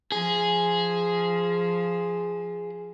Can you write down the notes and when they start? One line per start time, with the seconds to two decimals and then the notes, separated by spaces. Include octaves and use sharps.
0.12 F3 G#4